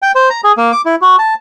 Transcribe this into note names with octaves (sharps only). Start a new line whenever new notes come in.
G5
C5
A#5
G#4
A#3
D6
E4
F#4
A5